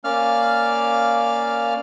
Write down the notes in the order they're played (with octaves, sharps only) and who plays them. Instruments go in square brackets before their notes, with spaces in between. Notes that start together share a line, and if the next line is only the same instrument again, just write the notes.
[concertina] A#3 C#4 D5 F5 F6